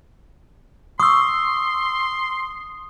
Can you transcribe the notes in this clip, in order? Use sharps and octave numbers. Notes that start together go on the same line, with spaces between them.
C6 C#6 D#6 E6